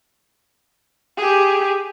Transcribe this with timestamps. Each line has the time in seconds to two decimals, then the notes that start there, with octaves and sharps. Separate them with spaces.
1.17 G4 G#4